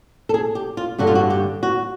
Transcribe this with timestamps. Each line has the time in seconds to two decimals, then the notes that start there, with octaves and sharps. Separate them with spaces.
0.29 A4
0.34 G#4
0.55 G4
0.77 F4
0.98 G2 D3 F#4
1.07 F4
1.15 F#4
1.30 G4
1.63 F#4